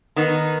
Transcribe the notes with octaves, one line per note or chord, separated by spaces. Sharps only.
D#3 B3 D#4